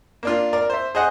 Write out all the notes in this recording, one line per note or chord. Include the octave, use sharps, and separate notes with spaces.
A#3 D4 F4
A#4 D5
C5 E5
G#4 C5 D#5 F#5